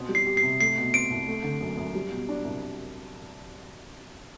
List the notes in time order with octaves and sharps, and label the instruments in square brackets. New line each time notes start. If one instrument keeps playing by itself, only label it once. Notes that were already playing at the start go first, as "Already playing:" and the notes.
Already playing: [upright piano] B2 C4
G3
[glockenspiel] C7
[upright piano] G4
[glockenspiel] C7
[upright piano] C3
[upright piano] A3 [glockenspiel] C7
[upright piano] B2
[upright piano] C4 [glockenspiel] D7
[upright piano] C2
A3
D3
F#2
F#2
G3
B2
D4
C2